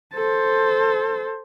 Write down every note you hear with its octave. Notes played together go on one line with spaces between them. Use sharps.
A4 C5